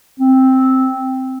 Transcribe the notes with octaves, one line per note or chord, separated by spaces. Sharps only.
C4